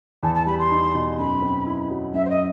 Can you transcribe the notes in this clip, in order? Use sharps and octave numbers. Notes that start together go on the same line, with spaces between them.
E2 A5
A5
G3 B5
C6
D#4
B2
F#2 B5
C4
E4
F#3
F#2 E5
C5
D#5